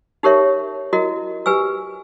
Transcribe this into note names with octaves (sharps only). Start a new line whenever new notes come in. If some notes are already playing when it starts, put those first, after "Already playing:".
D#4 G4 A#4 C#5 E5
E4 F#4 A#4 D#5
G4 B4 G#5 E6